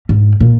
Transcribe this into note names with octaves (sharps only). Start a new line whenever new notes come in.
G#2
A#2